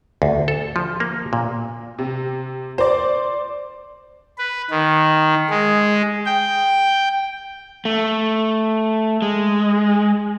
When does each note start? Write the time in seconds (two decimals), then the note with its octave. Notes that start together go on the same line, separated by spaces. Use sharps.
0.22 D2
0.48 A4
0.76 F3
1.00 A#3
1.33 A#2
1.98 C3
2.78 C5 D5
4.38 B4
4.70 D#3
5.50 G#3
6.26 G5
7.85 A3
9.22 G#3